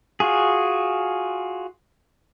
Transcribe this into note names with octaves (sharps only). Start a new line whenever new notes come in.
F4 F#4 G#4